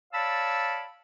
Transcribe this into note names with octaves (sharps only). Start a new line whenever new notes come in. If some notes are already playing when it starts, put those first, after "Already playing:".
C#5 D5 F5 A5 B5 E6